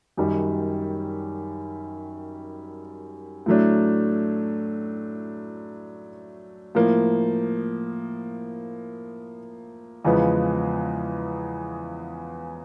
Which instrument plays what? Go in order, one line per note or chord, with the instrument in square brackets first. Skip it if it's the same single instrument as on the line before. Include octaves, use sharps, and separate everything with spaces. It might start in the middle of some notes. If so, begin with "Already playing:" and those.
[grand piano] F#2 D#3 G3
A2 F#3 A3 D4
A2 F3 A#3
E2 C#3 F3 G#3 B3